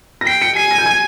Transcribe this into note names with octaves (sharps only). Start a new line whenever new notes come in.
A#6
G5 C7
C#7
G#5 C7
A#6
G6
G#6